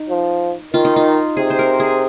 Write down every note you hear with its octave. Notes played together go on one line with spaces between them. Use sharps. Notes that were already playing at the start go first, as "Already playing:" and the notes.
Already playing: D#4
F3
D#3 F4
D#4
F4
C3 G#4
C5
A#4
G#4